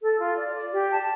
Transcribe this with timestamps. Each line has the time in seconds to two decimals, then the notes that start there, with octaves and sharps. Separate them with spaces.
0.02 A4
0.19 F4
0.38 D5
0.55 D5
0.73 G4
0.91 A5